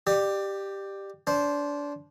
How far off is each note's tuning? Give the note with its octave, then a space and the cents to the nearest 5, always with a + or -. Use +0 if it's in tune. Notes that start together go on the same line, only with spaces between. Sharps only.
G4 +0 D5 +30
D4 -25 C5 +0